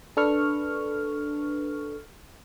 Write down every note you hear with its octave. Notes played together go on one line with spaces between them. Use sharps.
D4 A4 B4 C#6 F6